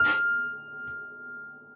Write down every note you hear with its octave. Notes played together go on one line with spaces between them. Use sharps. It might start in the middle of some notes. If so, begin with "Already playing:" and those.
Already playing: F6